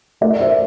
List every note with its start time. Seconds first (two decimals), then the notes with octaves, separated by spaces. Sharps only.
0.21 A3 A#4 D5
0.40 C5 E5